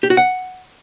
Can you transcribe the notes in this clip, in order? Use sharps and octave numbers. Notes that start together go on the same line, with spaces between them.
G4
F#4
F#5